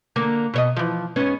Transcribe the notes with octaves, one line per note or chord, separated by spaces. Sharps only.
D3 A#3
B2 C#5 D#5
E3 F3
G#2 B3 C#4